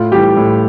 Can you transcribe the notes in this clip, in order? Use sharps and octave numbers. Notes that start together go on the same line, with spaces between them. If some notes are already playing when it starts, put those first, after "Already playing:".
Already playing: A2 F4
E3 G3 G4
A2